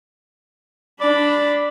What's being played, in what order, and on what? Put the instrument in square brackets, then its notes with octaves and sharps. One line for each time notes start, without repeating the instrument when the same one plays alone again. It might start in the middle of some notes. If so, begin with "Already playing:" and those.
[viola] D4 B5 [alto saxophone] D5